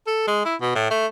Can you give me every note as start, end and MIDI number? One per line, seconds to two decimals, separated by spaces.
0.07 0.24 69
0.27 0.44 56
0.45 0.55 64
0.61 0.73 47
0.75 0.89 45
0.90 1.06 57